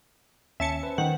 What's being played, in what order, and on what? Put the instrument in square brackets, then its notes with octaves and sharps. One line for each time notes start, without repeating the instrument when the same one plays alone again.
[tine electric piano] D#2 [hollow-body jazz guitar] C#4 [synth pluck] E5 A5 C#7
[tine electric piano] B4 C5
[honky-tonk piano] D#3 [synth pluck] F#5